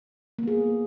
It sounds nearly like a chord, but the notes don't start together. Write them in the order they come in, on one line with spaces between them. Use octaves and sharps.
A#3 B3 G#4